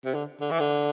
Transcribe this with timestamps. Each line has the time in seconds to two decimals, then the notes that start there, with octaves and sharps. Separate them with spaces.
0.05 C3
0.14 D3
0.40 D3
0.51 E3
0.60 D3